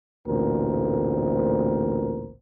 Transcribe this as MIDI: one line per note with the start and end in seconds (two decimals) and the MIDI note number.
0.28 2.32 33
0.28 2.32 38
0.28 2.32 46
0.28 2.32 60
0.28 2.32 70
0.28 2.32 72